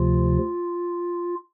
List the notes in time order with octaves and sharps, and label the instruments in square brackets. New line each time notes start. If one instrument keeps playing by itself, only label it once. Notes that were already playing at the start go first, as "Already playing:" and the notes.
Already playing: [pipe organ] D2 C3 F3 F4